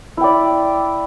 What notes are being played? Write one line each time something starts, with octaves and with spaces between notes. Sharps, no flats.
E4 D5 G5